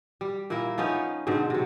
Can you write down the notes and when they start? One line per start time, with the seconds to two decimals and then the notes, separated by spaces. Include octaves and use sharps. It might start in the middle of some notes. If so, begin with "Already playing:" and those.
0.21 G3
0.50 A#2 A#3 E4 A#4
0.78 F3 B3 C#4 D#4
1.27 G#2 B2 D3 C4
1.50 C3 F#3